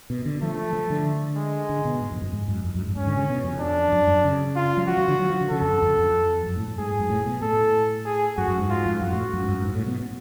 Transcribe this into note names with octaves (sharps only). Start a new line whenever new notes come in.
B2
D3
F3 A3
F3
D3
G#3
D3
B2
G#2
F2
F#2
G#2
F#2
F2
F#2
G#2
G#2 C#4
D3
C#3
B2
F2
D4
F#2
F#2
C#3
F4
F#3
F3 F#4
F#3
D3
F#3
F3
D3
C#3 A4
F2
F#2
F2
F2
F#2
A2
A2
G#2 G#4
F#2
A2
B2
A2 A4
G#4
F#2 F#4
F#2
G#2
G#2 F4
F2
F#2 F#4
A2
F#2
G#2
F#2
G#2
A2
B2